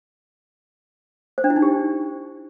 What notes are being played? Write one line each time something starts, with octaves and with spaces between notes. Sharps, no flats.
C5
D4
E4
D#4
G4